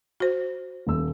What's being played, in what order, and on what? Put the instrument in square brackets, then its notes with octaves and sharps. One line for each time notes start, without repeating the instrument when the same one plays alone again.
[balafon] F#4 C5
[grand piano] D#1 E6